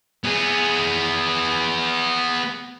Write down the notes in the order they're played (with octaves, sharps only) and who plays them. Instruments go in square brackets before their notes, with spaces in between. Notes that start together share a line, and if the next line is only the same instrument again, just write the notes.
[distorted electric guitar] B3 G#4